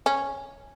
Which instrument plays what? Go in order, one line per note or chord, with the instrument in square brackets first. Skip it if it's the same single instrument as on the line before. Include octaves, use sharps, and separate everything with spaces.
[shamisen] C#4